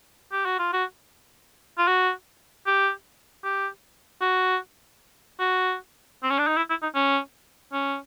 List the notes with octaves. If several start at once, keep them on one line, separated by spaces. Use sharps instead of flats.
G4
F#4
F4
F#4
F4
F#4
G4
G4
F#4
F#4
C4
C#4
D4
D#4
E4
E4
D#4
C#4
C#4